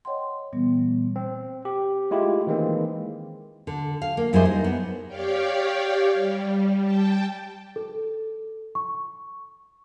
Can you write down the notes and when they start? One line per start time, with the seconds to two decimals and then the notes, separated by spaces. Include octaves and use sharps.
0.05 C#5 D#5 F#5 G5 C6
0.53 A#2 E3 G3 B3
1.16 C4
1.65 G4
2.11 G#3 A3 E4 F4 G4
2.47 D#3 E3 G#3 A#3 C4
3.67 D3
4.02 F5
4.17 A#3
4.33 F#2 G3 E4 G#4 C5 D#5
4.45 D#4
4.64 B3
5.08 G4 C#5 D5 F5 G5
6.12 G3
6.81 G5 A5
7.76 A4
8.75 C#6